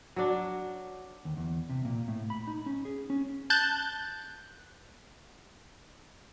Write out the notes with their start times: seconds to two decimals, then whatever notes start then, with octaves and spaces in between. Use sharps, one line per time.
0.16 F#3 D4
1.25 D#2
1.37 E2
1.69 C3
1.85 A#2
2.08 A2
2.30 B5
2.47 D#4
2.66 C#4
2.85 G#4
3.10 C#4
3.50 A5 F#6 G6 A6